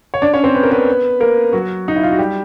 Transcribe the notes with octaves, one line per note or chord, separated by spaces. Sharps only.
C#5
D4 D5
C#4 C#5
C4 C5
B4
A#4
B3 B4
A#3 A#4
F#3 F#4
D#4
E4
F4
F#4
G3 G4